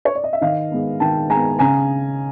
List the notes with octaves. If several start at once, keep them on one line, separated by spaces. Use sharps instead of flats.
C#5
D5
D#5
E5
D#3 D#5 F5
G#3 B3
D#3 G5 A5
G#3 B3 G#5 A#5
C#3 G#5 A#5